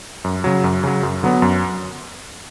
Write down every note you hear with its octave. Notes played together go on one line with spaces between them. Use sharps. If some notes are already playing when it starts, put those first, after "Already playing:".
F#2
C#3 F#3
F#2
C#3 F#3
F#2
D3 F#3 B3
F#2